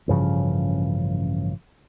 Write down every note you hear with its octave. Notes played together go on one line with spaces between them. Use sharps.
A1 G2 C#3 F3